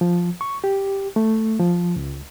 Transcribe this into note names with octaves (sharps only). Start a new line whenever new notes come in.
F3
C#6
G4
A3
F3
C#2